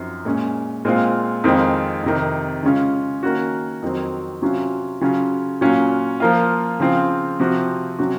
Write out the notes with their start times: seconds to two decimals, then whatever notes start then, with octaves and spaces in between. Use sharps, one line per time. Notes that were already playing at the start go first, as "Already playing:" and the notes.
Already playing: F#2 F3 C4 D#4 F#4
0.25 A#2 G#3 C#4
0.85 A#2 G#3 C4 F4
1.44 F2 D#3 G#3 C4 F4
2.04 F2 C3 D#3
2.63 C#3 G#3 C#4 F4
3.23 D#3 A#3 C#4 F#4
3.82 F2 D#3 F#3 C4
4.42 C3 F#3 C#4 F4
5.01 C#3 F#3 C#4 F4
5.61 A#2 F#3 C#4 F4
6.20 F3 A#3 F4
6.80 C#3 F3 C4 F4
7.40 C3 F3 C4 F#4
7.99 C3 F#3 C#4 F#4